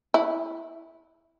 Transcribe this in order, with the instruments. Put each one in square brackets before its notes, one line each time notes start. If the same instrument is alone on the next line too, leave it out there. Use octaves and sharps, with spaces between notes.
[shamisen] E4